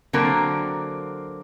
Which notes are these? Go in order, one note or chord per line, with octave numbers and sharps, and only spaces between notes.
D3 F#3 A#3 C4 F#4 A#4